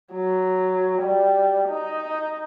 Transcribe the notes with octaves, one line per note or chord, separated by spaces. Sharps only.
F#3
G3
D#4